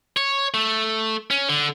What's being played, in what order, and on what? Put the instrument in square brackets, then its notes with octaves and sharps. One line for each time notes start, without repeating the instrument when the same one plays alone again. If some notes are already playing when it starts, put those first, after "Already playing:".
[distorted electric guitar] C#5
A3
C#4
D3